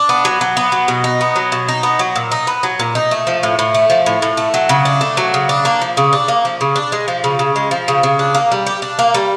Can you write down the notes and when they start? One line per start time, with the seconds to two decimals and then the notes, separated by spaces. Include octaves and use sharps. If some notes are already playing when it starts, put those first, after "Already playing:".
Already playing: D4
0.09 B3
0.25 F#3
0.41 F#3
0.57 B3
0.72 F#3
0.88 B2
1.04 D#4
1.21 B3
1.36 F#3
1.52 B2
1.68 D#4
1.83 B3
1.99 F#3
2.16 A#2
2.32 D#4
2.47 B3
2.63 F#3
2.79 A#2
2.95 D#4
3.11 A3
3.27 F3
3.43 A2
3.59 A2
3.74 A3
3.90 F3
4.06 A2
4.22 A2
4.37 A3
4.54 F#3
4.69 C#3
4.85 D4
5.01 A3
5.17 F#3
5.34 C#3
5.49 D4
5.65 A#3
5.81 F3
5.97 C#3
6.13 D4
6.28 A#3
6.45 F3
6.61 C#3
6.76 D4
6.92 G#3
7.08 F3
7.24 C#3
7.39 C#3
7.56 G#3
7.71 F3
7.88 C#3
8.03 C#3
8.19 D4
8.35 A#3
8.52 G3
8.67 G4
8.82 D4
8.99 A#3
9.14 G3